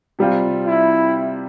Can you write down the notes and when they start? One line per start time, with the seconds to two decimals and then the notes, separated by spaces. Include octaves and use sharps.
0.19 C3 G3 C4 F4
0.66 E4